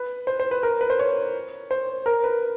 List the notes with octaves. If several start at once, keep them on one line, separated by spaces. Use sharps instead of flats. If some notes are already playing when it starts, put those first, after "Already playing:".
Already playing: B4
C5
C5
B4
A#4
B4
C5
C#5
C5
A#4
B4